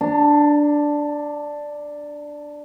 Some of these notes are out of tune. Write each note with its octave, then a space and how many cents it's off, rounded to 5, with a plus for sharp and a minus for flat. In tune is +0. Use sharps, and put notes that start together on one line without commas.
D4 +0 A#5 -40